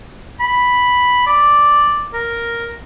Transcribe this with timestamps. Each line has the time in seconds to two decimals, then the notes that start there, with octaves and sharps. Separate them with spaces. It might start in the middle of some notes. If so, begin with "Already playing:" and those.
0.40 B5
1.27 D5
2.13 A#4